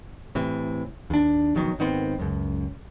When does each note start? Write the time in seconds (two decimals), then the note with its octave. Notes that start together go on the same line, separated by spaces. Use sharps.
0.35 A2 C3 E3
1.10 D#2 D4
1.55 A#1 B2 D#3 F#3
1.79 G#1 D#3 B3 C4
2.19 C#2 F#2